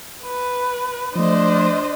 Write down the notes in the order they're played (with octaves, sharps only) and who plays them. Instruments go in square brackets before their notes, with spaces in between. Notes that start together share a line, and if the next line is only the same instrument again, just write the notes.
[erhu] B4
[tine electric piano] F3 A3 [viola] D4 D#5 [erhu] C5